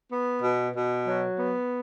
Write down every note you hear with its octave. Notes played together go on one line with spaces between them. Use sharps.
B3
B2
B2
F#3
B3